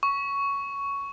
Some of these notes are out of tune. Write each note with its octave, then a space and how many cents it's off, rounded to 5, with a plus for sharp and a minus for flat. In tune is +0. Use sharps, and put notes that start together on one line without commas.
C#6 +10